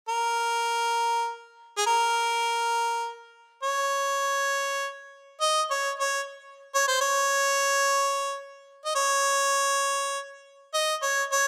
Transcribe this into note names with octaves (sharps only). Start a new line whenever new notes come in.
A#4
G#4
A#4
C#5
D#5
C#5
C#5
C#5
C5
C#5
D#5
C#5
D#5
C#5
C#5